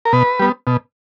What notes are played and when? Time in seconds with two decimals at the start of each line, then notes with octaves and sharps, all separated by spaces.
0.05 A#4
0.13 B2 B4
0.40 G3 B3
0.67 B2